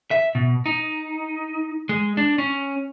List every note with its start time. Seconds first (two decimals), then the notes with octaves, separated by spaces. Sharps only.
0.11 E5
0.35 B2
0.66 D#4
1.89 G#3
2.17 D4
2.38 C#4